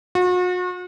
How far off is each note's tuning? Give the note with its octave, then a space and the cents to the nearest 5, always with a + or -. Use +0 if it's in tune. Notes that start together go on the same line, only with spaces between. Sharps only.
F#4 -40